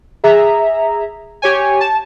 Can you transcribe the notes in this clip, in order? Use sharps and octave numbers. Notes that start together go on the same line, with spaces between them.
G#4 E5 A#5
G4 C#5 G#5
A5